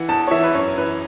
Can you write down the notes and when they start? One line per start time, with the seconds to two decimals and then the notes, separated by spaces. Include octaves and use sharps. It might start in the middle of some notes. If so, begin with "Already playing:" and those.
Already playing: E3 F#5
0.09 E2 A5
0.27 C#5
0.31 E3 E5
0.44 B4
0.54 F#2 C#5
0.78 E3 B4